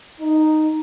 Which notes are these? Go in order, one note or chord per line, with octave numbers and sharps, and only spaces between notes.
D#4